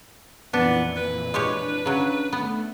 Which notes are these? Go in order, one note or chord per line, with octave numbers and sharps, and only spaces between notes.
F2 A#2 E3 B3 D4
B4
G#3 D4 G4 C#5
C#3 F#3
A3 B3